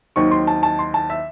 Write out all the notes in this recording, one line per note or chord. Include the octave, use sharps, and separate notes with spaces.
D#2 D#3 F#3 C4 C#6
C6
A5
A5
C6
A5
E5